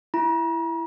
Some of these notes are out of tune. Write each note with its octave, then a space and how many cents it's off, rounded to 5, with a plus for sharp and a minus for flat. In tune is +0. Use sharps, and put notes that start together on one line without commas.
E4 +15 A#5 +45